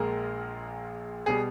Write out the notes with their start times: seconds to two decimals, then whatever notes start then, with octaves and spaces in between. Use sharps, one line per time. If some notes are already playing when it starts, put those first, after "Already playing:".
Already playing: A#1 A#2 G#3 A#4
1.26 B2 G3 G#4